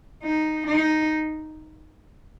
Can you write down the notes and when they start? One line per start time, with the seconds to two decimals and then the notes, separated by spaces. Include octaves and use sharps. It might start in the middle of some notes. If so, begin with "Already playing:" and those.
0.23 D#4
0.67 D#4